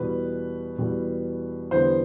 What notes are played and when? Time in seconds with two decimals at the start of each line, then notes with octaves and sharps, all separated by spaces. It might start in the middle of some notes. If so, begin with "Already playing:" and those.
Already playing: E2 B2 G3 B4
0.78 E2 B2 G3
1.71 E2 D3 G3 B3 C5